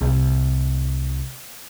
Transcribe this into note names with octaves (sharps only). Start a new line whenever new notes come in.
C2 A2